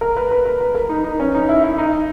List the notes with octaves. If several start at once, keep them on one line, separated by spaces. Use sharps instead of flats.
A#4
B4
B4
B4
B4
A#4
D#4
D#4
C#4
D#4
E4
E4
D#4